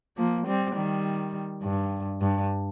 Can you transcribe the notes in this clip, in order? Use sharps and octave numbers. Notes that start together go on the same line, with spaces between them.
F3 A#3
G3 C4
D#3 G3
G2
G2